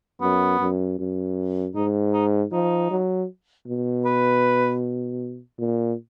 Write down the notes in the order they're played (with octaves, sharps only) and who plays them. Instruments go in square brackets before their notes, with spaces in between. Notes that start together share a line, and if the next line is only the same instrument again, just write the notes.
[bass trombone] F#2 [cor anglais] B3
[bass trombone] F#2
F#2
[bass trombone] G#2 [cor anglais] D#4
[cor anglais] D#4
[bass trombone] F3 [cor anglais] D#4
[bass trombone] F#3
B2
[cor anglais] B4
[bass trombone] A#2